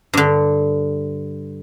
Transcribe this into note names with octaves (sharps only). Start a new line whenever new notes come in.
G2 D3